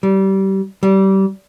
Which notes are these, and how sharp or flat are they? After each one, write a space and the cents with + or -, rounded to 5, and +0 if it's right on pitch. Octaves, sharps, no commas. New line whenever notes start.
G3 -25
G3 -25